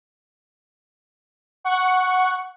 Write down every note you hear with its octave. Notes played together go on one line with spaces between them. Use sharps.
F#5 C#6